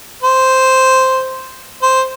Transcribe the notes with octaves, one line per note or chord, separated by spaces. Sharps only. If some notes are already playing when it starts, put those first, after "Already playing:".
C5
C5